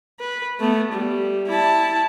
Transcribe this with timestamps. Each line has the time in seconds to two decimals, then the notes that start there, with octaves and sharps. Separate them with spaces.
0.20 B4
0.60 A3 B3
0.93 G3
1.47 E4 A5